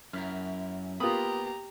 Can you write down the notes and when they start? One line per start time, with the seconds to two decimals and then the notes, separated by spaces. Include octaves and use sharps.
0.13 F#2 E4 A#4 F6
1.00 A#3 B3 F4 G4 A#5 B5 D#6